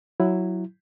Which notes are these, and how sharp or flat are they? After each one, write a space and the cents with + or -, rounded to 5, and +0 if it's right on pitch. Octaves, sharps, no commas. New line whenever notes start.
F#3 +0 E4 +5